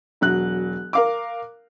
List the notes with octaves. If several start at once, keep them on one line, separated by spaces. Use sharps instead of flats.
E1 F#3 F#6
A#4 F5 D6